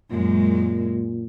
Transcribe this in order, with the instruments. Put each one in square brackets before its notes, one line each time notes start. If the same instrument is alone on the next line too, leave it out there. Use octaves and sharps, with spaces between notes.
[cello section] F#2 G#3 [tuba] A#2